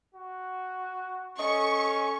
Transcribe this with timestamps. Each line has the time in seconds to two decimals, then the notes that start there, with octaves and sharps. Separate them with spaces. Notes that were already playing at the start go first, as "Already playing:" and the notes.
0.14 F#4
1.39 C#4 A4 D#5 C#6